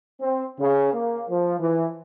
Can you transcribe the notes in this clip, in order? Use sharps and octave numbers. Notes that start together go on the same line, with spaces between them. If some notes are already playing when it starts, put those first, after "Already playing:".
C4
C#3
A#3
F3
E3